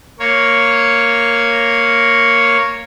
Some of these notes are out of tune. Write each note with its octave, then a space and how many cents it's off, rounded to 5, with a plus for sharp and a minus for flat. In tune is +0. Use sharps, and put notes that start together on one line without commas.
A#3 -5 C#5 +0